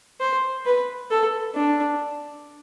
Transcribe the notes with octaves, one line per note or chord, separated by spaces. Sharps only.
C5
B4
A4
D4